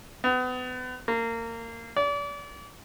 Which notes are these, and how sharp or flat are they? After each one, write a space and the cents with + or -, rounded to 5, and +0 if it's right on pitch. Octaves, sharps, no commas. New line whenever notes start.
B3 +35
A#3 -25
D5 -35